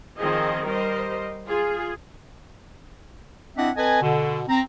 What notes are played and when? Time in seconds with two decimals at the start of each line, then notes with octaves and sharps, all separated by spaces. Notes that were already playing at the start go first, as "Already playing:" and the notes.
0.18 D#3 F3 C4 G#4 D#5
0.64 G3 A#4 C5 D#5
1.47 F4 G#4
3.57 C4 D4 E4 D#5 E5 F#5
3.76 C4 A4 B4 D#5 G#5
4.02 B2 D3
4.48 C4 A#5